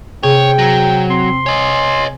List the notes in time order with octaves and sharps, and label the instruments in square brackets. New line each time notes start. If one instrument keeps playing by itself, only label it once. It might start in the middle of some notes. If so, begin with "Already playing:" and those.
[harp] C3 G#4 [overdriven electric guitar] C#5 [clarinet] G5
[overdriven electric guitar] F#3 [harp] A#5
[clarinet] C4 [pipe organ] C6
[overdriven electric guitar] C#5 D#5 [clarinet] G#5